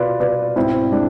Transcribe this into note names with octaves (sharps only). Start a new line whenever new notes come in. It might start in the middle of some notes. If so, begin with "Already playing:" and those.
Already playing: B2 F4 B4 D5
B2 B4 D5
G#2 C4 E4
G#3 D4